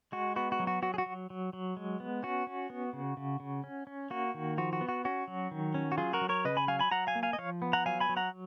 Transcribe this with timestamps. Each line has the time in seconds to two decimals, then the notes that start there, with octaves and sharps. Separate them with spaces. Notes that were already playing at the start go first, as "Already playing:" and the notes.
0.12 G#3 F#4
0.36 B3 F#4
0.52 F#4
0.60 F#3
0.67 F#4
0.82 F#3 F#4
0.94 G#4
0.98 F#4
1.06 F#3
1.30 F#3
1.53 F#3
1.77 G#3
2.00 B3
2.23 C#4 F#4
2.47 C#4
2.70 B3
2.93 C#3
3.17 C#3
3.40 C#3
3.64 C#4
3.87 C#4
4.10 A#3 F#4
4.34 D#3
4.58 F3 F#4
4.73 F#4
4.81 B3
4.89 F#4
5.05 C#4 F#4
5.28 F#3
5.51 D#3
5.74 C#4
5.92 F#4
5.98 F#3 F4 G#4
6.13 F#4 A#4
6.21 F#3
6.29 A#4 C#5
6.45 C#3 B4 D#5
6.57 G#5 B5
6.68 F#3 F5 G#5
6.79 G#5 B5
6.91 F#3 F#5 A#5
7.07 F5 G#5
7.15 A#3
7.23 F5 G#5
7.33 D#5
7.38 F3 C#5 F5
7.62 B3
7.73 F#5 A#5
7.86 F#3 F5 G#5
8.00 G#5 B5
8.09 F#3
8.17 F#5 A#5